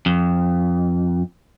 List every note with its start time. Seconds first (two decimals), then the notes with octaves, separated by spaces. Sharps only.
0.06 F2